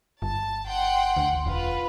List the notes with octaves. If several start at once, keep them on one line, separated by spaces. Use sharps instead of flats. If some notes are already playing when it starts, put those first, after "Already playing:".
G1 A5
F#5 G5 C6
D2
E1 F4 B4